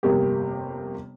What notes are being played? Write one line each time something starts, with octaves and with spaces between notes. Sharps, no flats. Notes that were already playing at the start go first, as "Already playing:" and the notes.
G1 F2 C3 A#3 G4